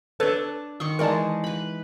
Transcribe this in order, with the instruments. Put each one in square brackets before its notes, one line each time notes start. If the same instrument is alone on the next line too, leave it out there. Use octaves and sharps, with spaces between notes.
[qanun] D4 A5 [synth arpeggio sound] A4 B4 C#5
[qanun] D#3 C6 C#6 [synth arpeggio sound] D#6
[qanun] E3 G#3 D#4 [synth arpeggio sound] A#4 D5 A5
[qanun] B4 B5